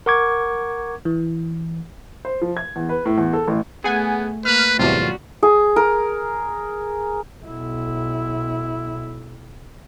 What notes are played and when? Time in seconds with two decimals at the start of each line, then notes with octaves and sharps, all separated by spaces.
0.06 A#4 F#5 C#6 D6 G#6
1.05 E3
2.25 C5
2.42 F3
2.57 G#6
2.76 E2
2.89 B4
3.05 A2
3.18 E2
3.33 A4
3.48 A1
3.84 A3 B3 G#4 F#5 G#5
4.45 A#3 B4 F6 F#6
4.79 E2 A2 C3 F#3 G3 F4 F#4
5.43 G#4
5.76 A#4
7.44 B1 E4